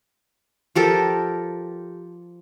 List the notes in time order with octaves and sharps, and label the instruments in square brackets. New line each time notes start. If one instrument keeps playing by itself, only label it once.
[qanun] F3 G4 A4 A#4